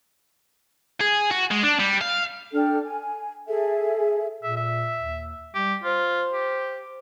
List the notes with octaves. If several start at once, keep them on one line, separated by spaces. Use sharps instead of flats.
G#4
F#4
G#3
D4
G3
F5
D4 A4 G5 F6
G#5
G#4 A4 E5
A#2 E5
E5
D#2
G3 G4
F4 C5
G4